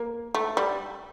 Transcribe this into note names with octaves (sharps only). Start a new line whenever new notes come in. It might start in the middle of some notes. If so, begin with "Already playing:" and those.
Already playing: A#3
A3
G3